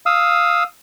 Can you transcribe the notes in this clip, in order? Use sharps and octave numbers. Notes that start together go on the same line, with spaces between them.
F5 D#6 E6